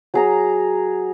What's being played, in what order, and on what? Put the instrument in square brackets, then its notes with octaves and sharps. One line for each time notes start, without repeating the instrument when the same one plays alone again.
[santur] F#3 G#4 A#5